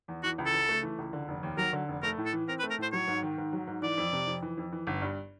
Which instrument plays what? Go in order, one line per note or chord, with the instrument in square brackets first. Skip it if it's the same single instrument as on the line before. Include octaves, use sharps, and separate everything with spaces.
[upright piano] E2
[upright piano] E3 [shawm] F#4
[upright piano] C#2
[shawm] A4
[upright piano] C#3
A3
E3
C#2
D3
F1
D#2
[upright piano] F#3 [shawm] A#4
[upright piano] D3
F1
[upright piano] A3 [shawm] A#4
[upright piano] A2
[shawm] A4
[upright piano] E3
[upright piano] C4 [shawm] A#4
[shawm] B4
[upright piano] A3
[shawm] A#4
[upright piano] A2 [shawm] C5
[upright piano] F#3 [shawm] C#5
[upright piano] G#2
D#3
G#2
F#3
G#2
[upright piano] E3 [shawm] D5
[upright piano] F2
C3
F2
E3
F2
E3
G1
G2